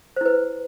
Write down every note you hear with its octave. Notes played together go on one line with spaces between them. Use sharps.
E4 B4 C5